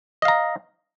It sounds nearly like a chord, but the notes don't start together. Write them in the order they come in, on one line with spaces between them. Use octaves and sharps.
D#5 F5 A#5